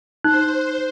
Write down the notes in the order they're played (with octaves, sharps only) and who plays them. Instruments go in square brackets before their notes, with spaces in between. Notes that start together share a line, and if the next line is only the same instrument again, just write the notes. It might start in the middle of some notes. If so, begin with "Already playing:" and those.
[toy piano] D#4 [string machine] C5 [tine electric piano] F#6